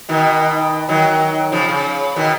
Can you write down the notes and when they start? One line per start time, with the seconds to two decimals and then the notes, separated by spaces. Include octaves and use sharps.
0.09 B2 D#3
0.89 D#3 F#3
1.52 C#3 F3
1.69 C#3
2.16 B2 D#3